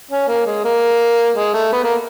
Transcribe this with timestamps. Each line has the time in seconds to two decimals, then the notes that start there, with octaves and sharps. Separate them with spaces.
0.11 C#4
0.28 A#3
0.46 G#3
0.64 A#3
1.37 G#3
1.54 A3
1.72 B3
1.84 A#3